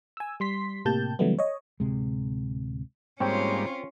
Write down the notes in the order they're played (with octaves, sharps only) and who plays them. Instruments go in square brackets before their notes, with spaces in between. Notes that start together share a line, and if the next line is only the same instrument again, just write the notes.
[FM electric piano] G#5 E6
G3 C6 B6
A2 C3 A#3 G4 A5 G6
C#3 E3 F#3 G3 A3 B3
C#5 D#5
[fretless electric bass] D1 G1 C3 G#3
[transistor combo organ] G#2 G3 A#3 [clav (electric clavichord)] C4 C#5 G5 [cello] C#4 F4